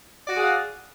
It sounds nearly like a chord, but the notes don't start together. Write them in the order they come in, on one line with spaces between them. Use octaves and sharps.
D5 F#4 G#4 F#5 F5